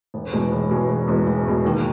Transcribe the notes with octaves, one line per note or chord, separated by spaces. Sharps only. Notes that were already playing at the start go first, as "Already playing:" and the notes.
E1
E2 B2 G#3
E1
E2 B2 G#3
E1
E2 B2 G#3
E1
E2 B2 G#3
D#2